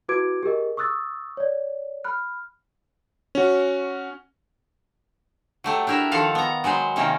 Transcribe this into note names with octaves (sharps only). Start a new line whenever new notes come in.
E4 F#4 B4 D6 G#6 D7
G4 G#4 A#4 D#5
C#6 D#6 E6 F#6 A6
C#5 D5
B5 F6 F#6
C#4 F#4
F#3 A3 G4
D4 E4 G4 A#4 E5
D#3 F3 A4 F5 F#5
B3 A#5
F#3 G#3 B4 C5
C3 D#3 A#3 C#4